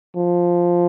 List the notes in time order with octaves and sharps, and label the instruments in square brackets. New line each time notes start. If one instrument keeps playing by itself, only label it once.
[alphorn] F3